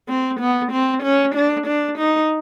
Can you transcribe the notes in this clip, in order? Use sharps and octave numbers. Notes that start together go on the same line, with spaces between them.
C4
B3
C4
C#4
D4
D4
D#4